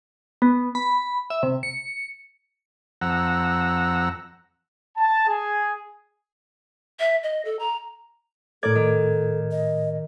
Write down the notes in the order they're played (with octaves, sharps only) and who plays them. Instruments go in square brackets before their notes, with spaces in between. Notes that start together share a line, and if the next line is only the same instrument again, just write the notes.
[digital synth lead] B3
B5
E5
C3
C#7
[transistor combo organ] F2 F#5 A#5 E6
[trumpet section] A5
G#4
[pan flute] E5
D#5
A4
A#5
[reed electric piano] A2 A#4 G#6 [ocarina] A4 [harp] D5
[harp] D#3
[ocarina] D#5